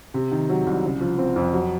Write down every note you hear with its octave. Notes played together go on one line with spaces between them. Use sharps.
C3
D#3
F#3
C2
C#3
F3
C4
F2
F#3